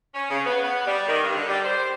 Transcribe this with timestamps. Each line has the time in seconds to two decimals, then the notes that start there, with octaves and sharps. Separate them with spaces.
0.14 C#4
0.30 C#3
0.46 B3
0.63 B3
0.87 G3
1.08 D#3
1.24 G2
1.35 D3
1.49 G3
1.65 C5